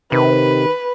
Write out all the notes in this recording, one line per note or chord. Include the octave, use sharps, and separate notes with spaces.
C3 D#3 B4